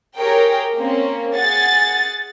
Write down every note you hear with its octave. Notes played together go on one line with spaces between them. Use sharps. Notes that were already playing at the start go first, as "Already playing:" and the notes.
G4 G#4 A#4 C#5 G5
A#3 C4 C#4
G#4 F#5 G#5 A6